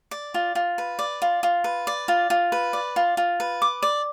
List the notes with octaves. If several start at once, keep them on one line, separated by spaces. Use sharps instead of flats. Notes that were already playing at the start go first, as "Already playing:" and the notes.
D5
F4
F4
B4
D5
F4
F4
B4
D5
F4
F4
B4
D5
F4
F4
B4
D6
D5